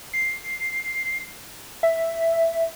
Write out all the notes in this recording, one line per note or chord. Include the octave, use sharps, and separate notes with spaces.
C7
E5